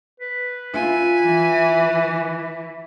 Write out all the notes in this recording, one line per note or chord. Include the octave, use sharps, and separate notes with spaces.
B4
E4 F4 G#5
E3